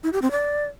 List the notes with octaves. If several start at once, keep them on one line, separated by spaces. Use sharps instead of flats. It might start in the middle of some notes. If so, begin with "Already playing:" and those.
E4
G4
C4
D5